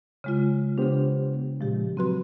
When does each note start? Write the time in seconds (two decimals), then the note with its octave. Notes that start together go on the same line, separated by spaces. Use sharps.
0.24 C#3 G#3 F4
0.78 C#3 B3 D4 G4 C5
1.61 A#2 F3 G#3 G4
1.97 F#3 C4 F#4 B4 C6